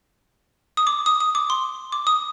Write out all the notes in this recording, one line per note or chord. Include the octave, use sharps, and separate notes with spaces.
D#6
D6
D#6
D#6
D6
C6
D6
D#6